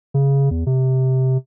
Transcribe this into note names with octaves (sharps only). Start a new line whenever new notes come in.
C#3
E2
C3